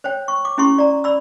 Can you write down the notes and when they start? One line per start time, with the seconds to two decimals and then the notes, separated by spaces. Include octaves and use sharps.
0.04 C5 C#5 G5
0.28 C#6
0.45 D6
0.58 C#4 E4 G4 C6 C#6
0.78 D5 A#5
1.04 D5 B5 E6